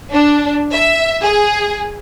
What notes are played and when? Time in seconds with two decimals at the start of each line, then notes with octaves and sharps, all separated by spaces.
0.12 D4
0.72 E5
1.22 G#4